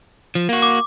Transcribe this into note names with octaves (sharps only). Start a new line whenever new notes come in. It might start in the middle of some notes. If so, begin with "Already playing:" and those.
F3
A#3 F#4
D6